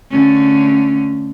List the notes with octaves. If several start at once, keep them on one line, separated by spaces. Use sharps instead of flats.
D3 A3 C#4